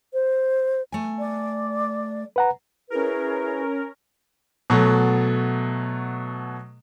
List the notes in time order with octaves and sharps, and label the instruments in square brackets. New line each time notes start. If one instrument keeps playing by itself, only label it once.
[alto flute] C5
[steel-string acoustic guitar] A3 G#5
[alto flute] D5
[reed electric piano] B4 F#5 A#5
[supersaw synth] C#4 A#4 [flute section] E4 G#4 B4
[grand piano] B2 F#3 A3